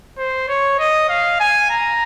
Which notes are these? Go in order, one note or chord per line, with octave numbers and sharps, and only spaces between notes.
C5
C#5
D#5
F5
G#5
A#5